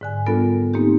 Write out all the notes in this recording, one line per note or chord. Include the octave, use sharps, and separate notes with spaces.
G#2 D3 G#5
G3 B3 D4 F4 A4 A#4
A#3 C4 D#4 G4